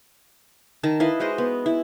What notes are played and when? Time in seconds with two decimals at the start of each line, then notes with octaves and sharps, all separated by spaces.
0.83 D#3 A5 A#5
1.00 E4 B4 D#5 F5
1.20 G#3 F#4 C5 D#5
1.38 B3
1.66 E4